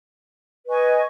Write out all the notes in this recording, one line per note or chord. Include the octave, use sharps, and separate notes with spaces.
B4 D#5 G#5 C#6